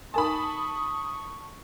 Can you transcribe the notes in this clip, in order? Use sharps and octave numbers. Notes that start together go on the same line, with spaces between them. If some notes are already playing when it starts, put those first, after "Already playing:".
D#4 A#4 G#5 A5 B5 C#6 D#6